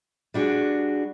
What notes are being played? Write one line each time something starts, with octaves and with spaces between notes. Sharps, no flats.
G3 D4 F#4 G#4